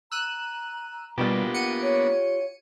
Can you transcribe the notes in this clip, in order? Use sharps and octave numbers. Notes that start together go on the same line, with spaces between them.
A#5 E6 F#6 D#7
B2 G3 A#3 B3 D4 F4 G4
F#5 C#7 D#7
C#5